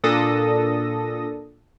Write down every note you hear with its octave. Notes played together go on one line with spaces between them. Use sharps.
A#2 D4 A4 D#6 A#6